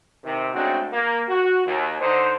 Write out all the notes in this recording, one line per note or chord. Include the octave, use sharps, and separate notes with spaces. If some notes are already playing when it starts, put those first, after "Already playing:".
C3 D#3
C#3 G#3 A3 C4 D4 F#4
A#3
F#4
D#2
D3 D#4 C5